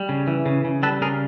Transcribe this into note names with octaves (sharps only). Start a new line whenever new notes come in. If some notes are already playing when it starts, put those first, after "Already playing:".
Already playing: G3
C#3
E3
C#3
C#3
G3 A4 B4
C#3 G#4 A#4